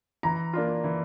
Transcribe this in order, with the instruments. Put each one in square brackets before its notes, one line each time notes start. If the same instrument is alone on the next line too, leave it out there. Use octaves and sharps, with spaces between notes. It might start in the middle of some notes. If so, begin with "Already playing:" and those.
[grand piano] E3 [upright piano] A#5
[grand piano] A#3 D4 F4
E3